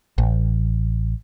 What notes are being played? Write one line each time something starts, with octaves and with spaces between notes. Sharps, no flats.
A1